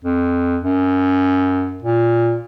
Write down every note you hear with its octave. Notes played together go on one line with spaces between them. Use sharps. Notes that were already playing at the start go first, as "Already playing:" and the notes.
F2
F#2
A#2